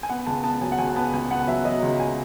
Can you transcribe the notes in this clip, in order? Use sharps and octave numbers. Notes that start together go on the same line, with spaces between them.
G#5
B3 F#5
C#2 A5
B3 A5
F#3 G#5
F#5
C#2 G#5
B3 A5
C#2 G#5
B3 F#5
F#3 E5
F#3 D#5
C#2
G#5